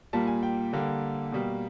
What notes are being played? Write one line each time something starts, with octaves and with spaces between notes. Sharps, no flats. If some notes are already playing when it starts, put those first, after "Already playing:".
A#2 G3 A#3 A5
G#5
G5
D3 G3 A#3
B2 G3 A#3